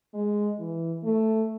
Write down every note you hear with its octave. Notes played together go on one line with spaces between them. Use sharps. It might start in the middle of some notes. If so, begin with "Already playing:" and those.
G#3
E3
A3